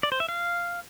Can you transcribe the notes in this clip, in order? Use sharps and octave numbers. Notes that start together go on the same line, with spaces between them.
D5
C5
E5
F5